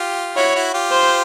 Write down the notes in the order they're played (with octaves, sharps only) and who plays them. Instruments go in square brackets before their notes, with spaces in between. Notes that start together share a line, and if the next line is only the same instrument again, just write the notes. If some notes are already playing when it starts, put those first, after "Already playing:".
Already playing: [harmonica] F4 G4
[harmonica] E4 F#4 [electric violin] C#5
[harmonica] E4 F#4
F4 G4
[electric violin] C5